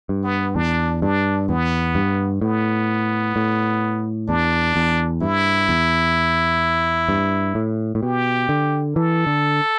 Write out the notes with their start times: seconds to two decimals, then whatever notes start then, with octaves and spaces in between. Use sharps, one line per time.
0.09 G2
0.24 B3
0.55 E2 D4
1.02 G2 D4
1.49 E2 B3
1.95 G2
2.41 A2 B3
3.36 A2
4.29 E2 D4
4.76 E2
5.22 G2 E4
5.69 E2
7.09 G2
7.55 A2
7.95 A2
8.02 B2 G4
8.49 D3
8.95 E3 A4
9.27 D3